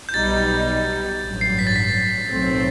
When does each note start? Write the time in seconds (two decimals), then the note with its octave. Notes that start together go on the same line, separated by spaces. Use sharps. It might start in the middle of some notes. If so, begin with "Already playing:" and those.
0.09 G6
0.14 B1 B2 G3 D#4 A6
1.22 A1 G2 F#3
1.41 C7
1.59 B6
1.67 A6
1.76 B6
2.31 B1 A2 F#3 A3 C4